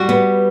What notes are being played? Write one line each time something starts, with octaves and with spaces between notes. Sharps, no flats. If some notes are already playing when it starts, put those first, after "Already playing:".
Already playing: G3 F#4
B3